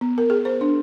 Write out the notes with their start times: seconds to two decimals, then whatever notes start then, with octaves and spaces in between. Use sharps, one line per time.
0.01 B3
0.18 A#4
0.30 G#4
0.45 C5
0.61 D4